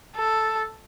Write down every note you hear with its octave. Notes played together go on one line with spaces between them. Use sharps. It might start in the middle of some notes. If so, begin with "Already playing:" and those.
A4